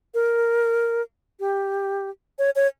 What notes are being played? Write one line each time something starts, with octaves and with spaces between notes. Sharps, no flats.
A#4
G4
C#5
C#5